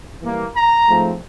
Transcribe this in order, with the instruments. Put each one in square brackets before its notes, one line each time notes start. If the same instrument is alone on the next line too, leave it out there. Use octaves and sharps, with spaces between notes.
[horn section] E3 G3 A#3
A#5
G#2 F3 A3 C4